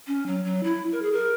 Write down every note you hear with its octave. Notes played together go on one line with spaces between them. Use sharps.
C#4
F#3
F#3
E4
A#4
G#4
A#4